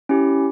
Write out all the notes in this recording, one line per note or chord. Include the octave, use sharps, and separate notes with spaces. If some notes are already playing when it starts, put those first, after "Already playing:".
C#4 E4 G4